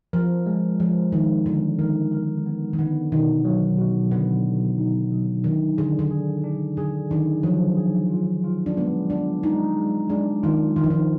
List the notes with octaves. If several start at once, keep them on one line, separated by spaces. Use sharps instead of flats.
F3 A#4
G#3
F3 G#3
D#3 G#3
D3 B3
D#3 A#4
A#4
B3
D#3
D3 B3
B2 D#3
F#3
B2
D3 B3
B2
D#4
F#3
D#3 D4
D3 G#4
D3
G#4
D4
D3 G#4
D#3 D4
F3 F#3
G#4
F4
F4
D4
G#3 B3
D4 F4
G#3 D#4
G#3
G#3 D4
D#3 F4
D#3 F4
F3
D#3